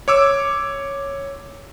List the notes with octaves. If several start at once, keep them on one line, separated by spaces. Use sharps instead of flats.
C#5 D6 E6